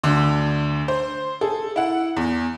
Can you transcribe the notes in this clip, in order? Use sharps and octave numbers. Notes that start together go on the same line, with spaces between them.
D2 D3
C5
G#4 A4
E4 F#5
E2